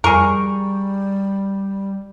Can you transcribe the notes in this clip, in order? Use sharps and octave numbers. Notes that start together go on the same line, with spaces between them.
F2 G3 G#4 A#4 C#6